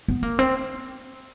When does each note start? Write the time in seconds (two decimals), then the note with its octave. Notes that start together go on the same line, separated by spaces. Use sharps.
0.08 B3
0.23 A#3
0.39 C4